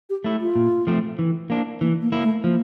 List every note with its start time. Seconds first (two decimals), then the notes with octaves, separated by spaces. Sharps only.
0.10 G4
0.24 A3 E4
0.40 F4
0.55 A#2
0.87 F3 A3 C4
1.19 E3
1.50 A#3 D4
1.81 E3 A#3
2.02 A#3
2.12 A#3 E4
2.23 A3
2.44 F3 A#3